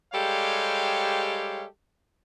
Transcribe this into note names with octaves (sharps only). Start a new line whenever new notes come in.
G3 G#3 G4 A4 C#5 F5